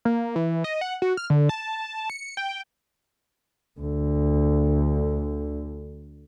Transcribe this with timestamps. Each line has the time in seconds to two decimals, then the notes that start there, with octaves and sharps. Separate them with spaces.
0.05 A#3
0.35 E3
0.64 D#5
0.81 F#5
1.02 F#4
1.17 F6
1.30 D3
1.49 A5
2.10 C#7
2.37 G5
3.80 D2 D3